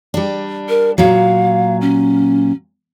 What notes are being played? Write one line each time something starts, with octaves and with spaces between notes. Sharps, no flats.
G3 D4
A#4
A#2 F#3 F5
C#4